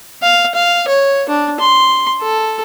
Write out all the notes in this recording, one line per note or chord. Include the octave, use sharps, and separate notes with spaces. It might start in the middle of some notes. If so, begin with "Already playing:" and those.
F5
F5
C#5
D4
C6
A4